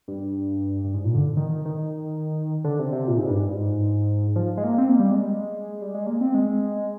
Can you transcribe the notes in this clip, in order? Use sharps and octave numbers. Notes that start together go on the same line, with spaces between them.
G2
G2
G#2
A#2
D3
D#3
D#3
D#3
D3
C3
C3
A#2
G#2
G2
G#2
F3
G#3
A#3
C4
A#3
G3
G#3
G3
G#3
A#3
C4
G#3